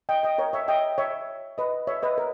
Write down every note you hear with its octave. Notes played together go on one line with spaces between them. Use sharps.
D#5 G5
D#5 G5
A#4 C#5
C#5 E5
D#5 G5
C#5 E5
B4 D#5
C#5 E5
B4 D#5
A#4